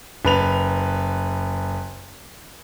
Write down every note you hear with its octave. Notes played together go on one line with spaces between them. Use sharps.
F#1 B4 F7